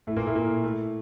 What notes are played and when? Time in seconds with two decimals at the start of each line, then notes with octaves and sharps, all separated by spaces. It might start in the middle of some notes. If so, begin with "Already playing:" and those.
0.07 A2 A3
0.16 A#2 A#3
0.27 A2 A3
0.35 A#2 A#3
0.64 A2 A3